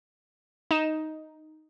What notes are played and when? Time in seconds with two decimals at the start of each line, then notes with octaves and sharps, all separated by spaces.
0.71 D#4 E7